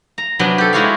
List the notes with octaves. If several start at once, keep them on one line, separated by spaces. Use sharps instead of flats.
A#5
C3 F#3 B3 D4
G4 A4
G#3 E4 F#4 G4 C#5 F5